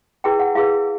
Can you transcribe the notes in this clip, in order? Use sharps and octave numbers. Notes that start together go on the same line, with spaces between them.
E4 G#4 B4 G5
F#5
E4 G#4 B4 F5